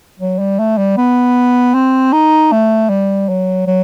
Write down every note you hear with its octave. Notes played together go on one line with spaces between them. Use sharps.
F#3
G3
A3
G3
B3
C4
D#4
A3
G3
F#3
F#3